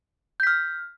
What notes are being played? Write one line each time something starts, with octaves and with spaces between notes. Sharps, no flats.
F6 G6 B6